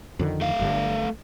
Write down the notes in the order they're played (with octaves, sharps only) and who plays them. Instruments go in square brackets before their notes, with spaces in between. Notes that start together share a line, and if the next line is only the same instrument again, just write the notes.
[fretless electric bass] F2 D3 D#3
[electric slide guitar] A3 F5
[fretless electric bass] G1 G2 D3